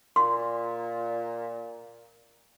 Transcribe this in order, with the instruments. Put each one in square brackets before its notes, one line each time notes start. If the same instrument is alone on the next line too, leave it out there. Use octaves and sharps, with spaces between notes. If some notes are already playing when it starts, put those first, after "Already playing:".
[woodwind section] A#2 [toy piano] C6